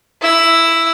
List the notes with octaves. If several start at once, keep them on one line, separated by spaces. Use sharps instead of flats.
E4 E6